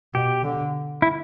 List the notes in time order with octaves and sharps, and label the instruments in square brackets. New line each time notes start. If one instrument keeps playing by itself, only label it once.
[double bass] B2 [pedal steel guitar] G4
[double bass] D3
[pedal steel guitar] E4